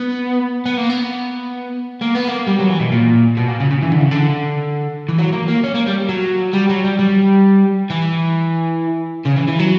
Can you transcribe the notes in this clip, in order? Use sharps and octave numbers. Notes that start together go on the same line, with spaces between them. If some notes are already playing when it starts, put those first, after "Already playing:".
Already playing: B3
B3
A#3
B3
A#3
B3
A#3
G3
F#3
E3
B2
A#2
B2
A#2
C#3
C#3
E3
D3
C#3
D3
E3
F#3
A#3
A#3
C#4
A#3
G3
F#3
G3
F#3
G3
G3
E3
C#3
E3
E3
F#3